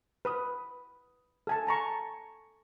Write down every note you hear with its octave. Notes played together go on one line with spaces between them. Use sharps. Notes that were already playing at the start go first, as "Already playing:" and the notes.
B4 B5 D#6
A4 G#5 A5
A5 A#5 C#6